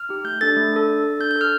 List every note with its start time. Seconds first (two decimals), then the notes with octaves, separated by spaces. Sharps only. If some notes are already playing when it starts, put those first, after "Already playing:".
Already playing: F6
0.09 D#4 G4
0.24 A3 G6
0.41 D4 A4 A6
0.57 A3
0.73 D4 A4
0.89 D4
1.04 A4
1.20 D4 G6
1.31 G6
1.36 A4
1.41 F6